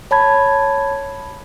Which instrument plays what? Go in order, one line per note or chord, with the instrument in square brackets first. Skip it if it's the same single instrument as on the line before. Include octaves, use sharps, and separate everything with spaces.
[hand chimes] C#5 A5 B5 G#6